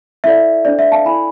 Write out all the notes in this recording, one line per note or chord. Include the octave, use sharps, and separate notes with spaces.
E4 A4 D5 E5
D4 A4 C5 D5
E5
F5 A5
E4 A4 D5 G#5 B5